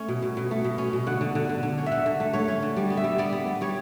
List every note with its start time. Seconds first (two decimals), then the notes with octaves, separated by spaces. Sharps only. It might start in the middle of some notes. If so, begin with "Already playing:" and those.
Already playing: A3 C#4
0.09 B2
0.23 B2
0.37 B2
0.51 A3
0.64 B2
0.78 C#4
0.93 B2
1.06 D3 F#5
1.21 D3
1.35 D3
1.49 D3
1.63 D3
1.78 C#4
1.86 E5
1.92 D3 F#5
2.06 D3
2.20 A3
2.33 A3 C#5
2.48 C#4
2.62 D3
2.76 G3 D5
2.90 B3
2.97 E5
3.04 G3
3.18 B3 D5
3.33 B3
3.46 B3
3.61 G3 C#5